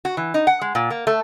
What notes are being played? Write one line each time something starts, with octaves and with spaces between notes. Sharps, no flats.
F#4
E3
D#4
F#5
G#3
A#2
A#3
A3